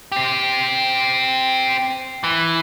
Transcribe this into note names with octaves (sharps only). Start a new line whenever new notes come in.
C4 G4
E3